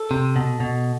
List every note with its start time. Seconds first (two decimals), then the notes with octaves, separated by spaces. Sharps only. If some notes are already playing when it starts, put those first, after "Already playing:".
Already playing: A4
0.11 C3
0.36 B2
0.60 B2